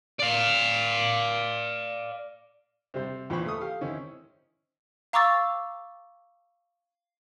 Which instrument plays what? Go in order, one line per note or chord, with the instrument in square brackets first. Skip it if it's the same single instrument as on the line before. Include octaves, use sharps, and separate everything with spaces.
[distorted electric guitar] D5 F5
[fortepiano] C3 G3 C5
E2 A#2 C5 G5 B5 C#6
A3 A4 D#6
G4 F5
D#3 C4 C#4 E4
[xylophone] F5 A#5 C#6 D6 E6 A6